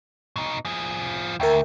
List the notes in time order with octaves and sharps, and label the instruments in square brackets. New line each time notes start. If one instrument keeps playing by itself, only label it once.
[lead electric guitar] B2 D#4
F3 G#4
[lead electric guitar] D2 [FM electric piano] A#4 E5 G5